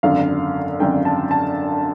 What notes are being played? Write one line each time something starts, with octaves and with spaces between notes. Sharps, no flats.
G#1 F#2 D3 F5
G#1 F#2 D3 G5
A5
A5